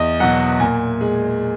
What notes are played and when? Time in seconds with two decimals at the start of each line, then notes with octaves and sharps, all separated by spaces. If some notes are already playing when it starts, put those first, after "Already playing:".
Already playing: E2 D#5
0.20 B2 F#3 F#5
0.60 A#2 G#5
1.01 G#3